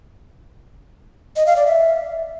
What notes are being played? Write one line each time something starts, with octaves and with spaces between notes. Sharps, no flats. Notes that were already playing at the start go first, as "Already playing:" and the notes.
D#5
F5
D5
E5